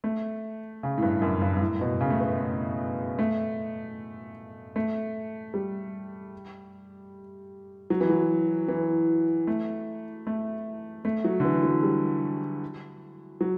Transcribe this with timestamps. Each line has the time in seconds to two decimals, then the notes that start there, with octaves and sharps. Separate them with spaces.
0.04 A3
0.83 C#3
0.98 A2
1.02 G2
1.22 F#2
1.42 G2
1.56 G2
1.61 A2
1.81 B2
2.01 C#3
2.10 A3
2.20 B3
2.40 A3
3.19 A3
4.76 A3
5.54 G3
7.90 F#3
8.01 E3
8.10 F#3
8.68 E3
9.47 A3
10.27 A3
11.05 A3
11.25 F#3
11.40 D3
11.45 E3
11.63 F#3
11.83 G3
13.41 F#3